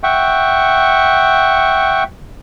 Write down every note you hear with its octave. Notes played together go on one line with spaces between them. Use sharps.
E5 F#5 G5 C#6